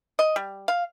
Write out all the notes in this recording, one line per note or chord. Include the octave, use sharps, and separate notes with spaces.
D#5
G3
F5